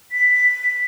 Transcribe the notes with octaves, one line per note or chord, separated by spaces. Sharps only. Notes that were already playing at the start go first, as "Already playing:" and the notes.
B6